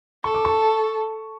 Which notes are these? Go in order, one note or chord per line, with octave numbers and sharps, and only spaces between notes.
A4 C#6
D6
A5 C#6